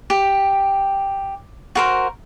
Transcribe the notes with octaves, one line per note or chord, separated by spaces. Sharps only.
G4
F#4 A#4 C5